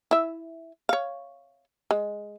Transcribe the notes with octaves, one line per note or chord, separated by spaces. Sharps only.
E4 E5
C#5 F5
G#3